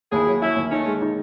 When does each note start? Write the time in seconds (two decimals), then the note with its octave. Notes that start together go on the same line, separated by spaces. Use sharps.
0.11 D#2 E4 G#4
0.27 F#3
0.41 F#3 C#4 E4
0.56 D#2
0.71 A3 C#4 D#4
0.86 G#3
1.02 D#4